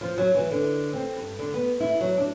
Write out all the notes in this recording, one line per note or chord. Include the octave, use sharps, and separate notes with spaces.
F3
F#3
E3
D3
C4
G2
D3
B3
E4
F#3
D4